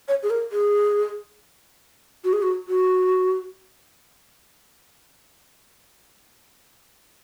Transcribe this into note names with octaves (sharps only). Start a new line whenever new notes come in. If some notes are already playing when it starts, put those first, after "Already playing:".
C#5
G#4
A#4
G#4
F#4
G#4
F#4
F#4